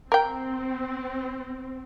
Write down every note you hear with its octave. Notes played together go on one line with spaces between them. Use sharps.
C4 A#4 G5